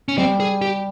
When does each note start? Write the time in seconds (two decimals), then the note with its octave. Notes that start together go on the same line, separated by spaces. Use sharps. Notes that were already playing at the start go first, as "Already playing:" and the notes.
0.08 C#4
0.17 G3 C4
0.40 G#4
0.62 G4